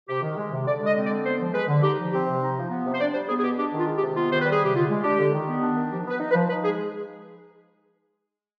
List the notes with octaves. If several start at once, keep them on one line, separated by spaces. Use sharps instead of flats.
C3 G4
D#3
G#3
C3
D3 D5
G#3 D#5
C4
D5
D3
B3 C5
F3
G#3 B4
D3
D#4 G4
F3
C4 G4
C3
D#4
F3
B3
C3
C5
D4 D5
G3 C5
B3 G#4
G#4
B2 G4
D4 G4
D#3
F4
G#3
G4
C3
B3 F4
D#3 C5
G3 B4
G#4
C3 G4
D3 F4
G#3
D4 G4
D3
D#3
B3
D4
D#3
F3 G4
B3 B4
D#4
B4
F3
D#4 B4
G#3 G#4